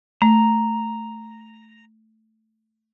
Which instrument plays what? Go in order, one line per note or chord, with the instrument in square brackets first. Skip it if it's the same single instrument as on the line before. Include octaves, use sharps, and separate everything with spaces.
[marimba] A3 [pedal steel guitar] A#5